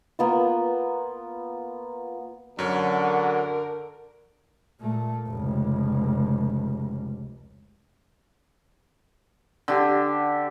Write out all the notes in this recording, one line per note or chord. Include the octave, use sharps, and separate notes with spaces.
A#3 B3 F4
F#2 D3 F#4 A#4 C#5
A#2 A3
F1 C#2
D3 G4